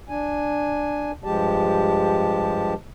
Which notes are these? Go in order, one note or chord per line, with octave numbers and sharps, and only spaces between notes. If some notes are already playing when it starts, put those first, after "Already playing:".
D4 G#5
G2 F3 G#3 G4 A5